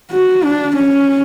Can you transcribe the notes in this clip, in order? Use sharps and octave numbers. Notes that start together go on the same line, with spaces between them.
F#4
D4
C#4